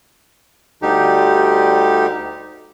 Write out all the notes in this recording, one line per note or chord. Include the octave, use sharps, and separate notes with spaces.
D2 D3 G3 D#4 G4